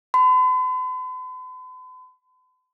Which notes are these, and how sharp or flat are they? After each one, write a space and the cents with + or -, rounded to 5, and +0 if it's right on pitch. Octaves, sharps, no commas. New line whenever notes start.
B5 +45